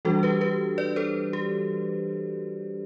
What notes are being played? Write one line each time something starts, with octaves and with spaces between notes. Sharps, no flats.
E3 G3 D4 F#4 A4
G4 B4
G4 B4
B4 D5
A4 C5
G4